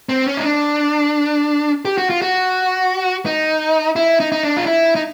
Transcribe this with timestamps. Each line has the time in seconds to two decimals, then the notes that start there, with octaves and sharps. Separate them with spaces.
0.09 C4
0.27 C#4
0.37 D#4
0.45 D4
1.85 G4
1.98 F#4
2.10 F4
2.22 F#4
3.26 D#4
3.96 E4
4.20 D#4
4.32 D#4
4.43 D4
4.57 F4
4.66 E4
4.95 D#4